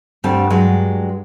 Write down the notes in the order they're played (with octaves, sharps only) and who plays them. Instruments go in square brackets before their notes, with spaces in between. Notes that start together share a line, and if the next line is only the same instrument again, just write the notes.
[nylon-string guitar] D2 G2 D3 G3 C4 A5
G2 F#3 G#3